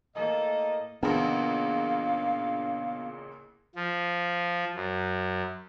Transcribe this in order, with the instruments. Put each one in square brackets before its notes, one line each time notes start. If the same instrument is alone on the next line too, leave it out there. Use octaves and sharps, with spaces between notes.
[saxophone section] A2 A#4 D#5 [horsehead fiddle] A#3 A4
[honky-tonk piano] A1 A#2 C#3 [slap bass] B3 D4 [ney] F5
[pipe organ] F3
F#2